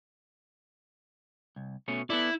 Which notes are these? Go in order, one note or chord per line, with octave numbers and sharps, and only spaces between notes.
C2
B2 A3 C#4
B3 E4 A4 D5